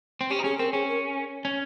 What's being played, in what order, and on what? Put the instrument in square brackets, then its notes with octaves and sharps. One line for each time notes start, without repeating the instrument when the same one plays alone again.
[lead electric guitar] C4
[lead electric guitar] C#4 [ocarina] G4
[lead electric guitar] D#4
[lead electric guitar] C#4 [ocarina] G#4
[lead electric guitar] C4 [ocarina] A#4
[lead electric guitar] C#4 [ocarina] G#4
[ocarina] A#4
[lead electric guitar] C#4